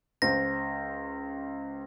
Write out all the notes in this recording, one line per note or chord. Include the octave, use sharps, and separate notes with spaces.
C#2 C5 A#6